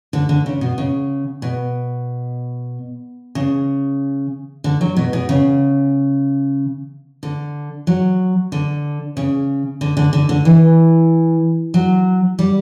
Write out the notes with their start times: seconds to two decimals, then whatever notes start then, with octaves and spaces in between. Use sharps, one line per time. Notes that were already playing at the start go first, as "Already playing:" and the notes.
0.13 D3
0.29 D3
0.46 C#3
0.61 B2
0.78 C#3
1.42 B2
3.35 C#3
4.64 D3
4.81 F#3
4.97 B2
5.13 B2
5.29 C#3
7.23 D3
7.87 F#3
8.52 D3
9.17 C#3
9.81 D3
9.97 D3
10.13 D3
10.29 D3
10.45 E3
11.74 F#3
12.39 G3